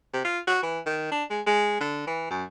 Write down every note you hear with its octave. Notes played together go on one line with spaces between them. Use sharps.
C3
F4
F#4
E3
D#3
D4
G#3
G#3
D3
E3
F#2